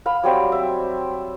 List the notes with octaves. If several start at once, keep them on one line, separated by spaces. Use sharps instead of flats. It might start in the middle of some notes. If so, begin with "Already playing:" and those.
F5 B5
F#3 G3 C4 D5
E5